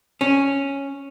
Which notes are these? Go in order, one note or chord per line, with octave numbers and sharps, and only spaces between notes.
C#4